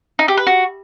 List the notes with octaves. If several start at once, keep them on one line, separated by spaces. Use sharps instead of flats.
D#4
G4
B4
F#4